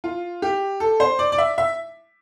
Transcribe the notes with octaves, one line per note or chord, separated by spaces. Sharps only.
F4
G4
A4
C5
D5
D5
E5
E5